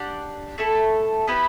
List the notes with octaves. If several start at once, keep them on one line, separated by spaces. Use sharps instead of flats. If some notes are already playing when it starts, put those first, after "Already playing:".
Already playing: D4 G4 D5 F#5
A3 E4 A4
B3 E4 G4 B4